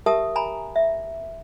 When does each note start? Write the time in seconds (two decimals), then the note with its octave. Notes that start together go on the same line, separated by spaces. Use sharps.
0.06 G4 A#4 E5 A5 D#6
0.36 G#5 A#5 B5
0.76 E5